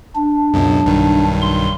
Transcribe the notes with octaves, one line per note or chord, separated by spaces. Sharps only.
D4
C#2 F#2 B2
B1 G2 D#3
C6